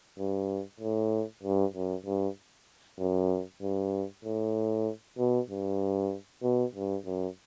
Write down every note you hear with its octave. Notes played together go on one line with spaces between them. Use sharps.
G2
A2
G2
F#2
G2
F#2
G2
A2
B2
G2
B2
G2
F#2